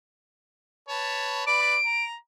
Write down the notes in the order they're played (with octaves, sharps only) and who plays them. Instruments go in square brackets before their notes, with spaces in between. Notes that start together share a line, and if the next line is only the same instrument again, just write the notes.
[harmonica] B4 C#5 A5
[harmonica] B4 D5 [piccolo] D7
[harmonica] A#5